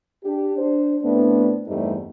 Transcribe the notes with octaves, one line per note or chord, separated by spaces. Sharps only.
D4 G4
D4 C5
A2 A3 B3 C4 D4
E2 G2 G3 A3 C4 D#4